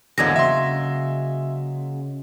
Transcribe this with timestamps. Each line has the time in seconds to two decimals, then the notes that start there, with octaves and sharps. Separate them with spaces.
0.18 G#1 E2 D3 F#3 G#3 A#3 G#6 A#6
0.36 C#3 E5 C6